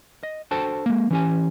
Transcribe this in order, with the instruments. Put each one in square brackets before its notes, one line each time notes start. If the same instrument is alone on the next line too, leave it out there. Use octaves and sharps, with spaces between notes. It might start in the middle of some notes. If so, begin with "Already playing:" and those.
[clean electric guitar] D#5
D4 F#4 A4 C5 G5 A5
G#3 A#3
E3 C#4 G4 G#5